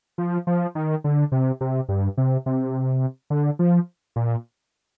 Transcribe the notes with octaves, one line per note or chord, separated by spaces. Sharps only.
F3
F3
D#3
D3
C3
C3
G2
C3
C3
D3
F3
A#2